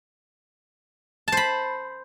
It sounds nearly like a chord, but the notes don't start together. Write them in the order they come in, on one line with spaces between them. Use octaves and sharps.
A5 C5 B5